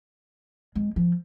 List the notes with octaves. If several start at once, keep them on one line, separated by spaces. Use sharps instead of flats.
G#3
F3